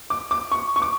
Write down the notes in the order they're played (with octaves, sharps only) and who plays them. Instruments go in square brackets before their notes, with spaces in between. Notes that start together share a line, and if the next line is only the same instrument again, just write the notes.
[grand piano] D6
D6
C#6
C#6
D6